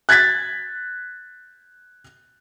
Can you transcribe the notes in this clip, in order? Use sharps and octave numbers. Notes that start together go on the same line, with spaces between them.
F#6 G#6 A6 B6